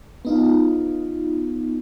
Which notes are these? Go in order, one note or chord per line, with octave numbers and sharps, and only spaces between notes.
B3 D#4 F4